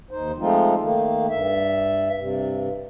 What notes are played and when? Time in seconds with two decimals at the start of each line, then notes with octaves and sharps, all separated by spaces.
0.11 D#2 D#4 C5
0.39 F3 G#3 A3 C4 D#4 F4
0.80 D#3 A3 A#3
1.29 G2 E5
2.18 G2 C3